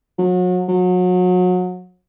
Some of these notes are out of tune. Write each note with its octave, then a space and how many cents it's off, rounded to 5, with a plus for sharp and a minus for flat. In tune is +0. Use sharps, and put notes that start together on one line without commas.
F#3 -35
F#3 -30